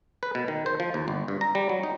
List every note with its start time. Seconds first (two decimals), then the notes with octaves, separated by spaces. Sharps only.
0.23 B4
0.35 B2
0.48 D#3
0.66 C5
0.80 F3
0.94 D#2
1.08 G1
1.28 G2
1.41 A#5
1.55 G3
1.69 F#3
1.83 D#4